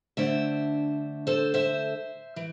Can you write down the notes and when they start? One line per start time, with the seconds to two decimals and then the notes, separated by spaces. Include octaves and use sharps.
0.17 D3 A3 D4 C5 E5
1.27 A4 C5
1.54 C5 E5
2.36 E3